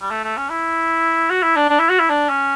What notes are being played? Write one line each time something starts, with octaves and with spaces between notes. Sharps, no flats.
G3
A3
A3
C#4
E4
F#4
E4
D4
D4
E4
F#4
E4
D4
C#4